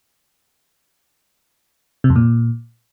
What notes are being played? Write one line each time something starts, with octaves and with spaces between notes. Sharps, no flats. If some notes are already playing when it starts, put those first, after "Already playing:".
C3
F2
A#2